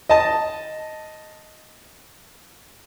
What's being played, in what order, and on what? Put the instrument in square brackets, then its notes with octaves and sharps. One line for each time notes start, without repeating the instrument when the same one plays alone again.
[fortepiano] D#5 A5